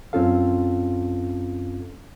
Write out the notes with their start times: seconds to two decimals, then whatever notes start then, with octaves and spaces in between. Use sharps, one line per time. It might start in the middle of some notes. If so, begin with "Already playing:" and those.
0.13 F#2 C4 C#4 F4 A4 F5